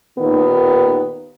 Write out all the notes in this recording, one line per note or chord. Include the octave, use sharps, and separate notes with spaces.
D#2 A#2 D#3 B3